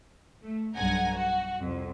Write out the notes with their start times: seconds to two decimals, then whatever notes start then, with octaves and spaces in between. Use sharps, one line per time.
0.43 A3
0.74 B1 G2 F#5 G#5 A#5
1.13 F#4
1.61 C2 F2